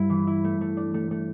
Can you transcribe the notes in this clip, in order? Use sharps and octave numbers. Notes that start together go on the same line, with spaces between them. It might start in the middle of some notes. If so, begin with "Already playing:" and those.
Already playing: G2 E4
E3
E4
A3
A3
D4
A3
A3